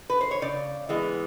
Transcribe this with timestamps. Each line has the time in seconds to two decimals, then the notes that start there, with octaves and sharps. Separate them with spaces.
0.10 B4
0.21 C5
0.31 C#5
0.42 C#3 D5
0.89 E3 G#3 B3